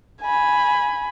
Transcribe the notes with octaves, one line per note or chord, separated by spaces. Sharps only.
G#5 B5